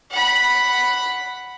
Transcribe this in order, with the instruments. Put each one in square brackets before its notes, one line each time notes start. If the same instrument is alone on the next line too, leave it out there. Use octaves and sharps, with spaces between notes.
[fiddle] F#5 B5